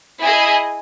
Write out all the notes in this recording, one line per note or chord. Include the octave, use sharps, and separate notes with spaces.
E4 G#4 D#5 G#5